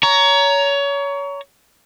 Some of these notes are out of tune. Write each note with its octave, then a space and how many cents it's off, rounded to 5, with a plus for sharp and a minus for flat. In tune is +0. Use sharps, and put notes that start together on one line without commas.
C#5 +25 A#5 +0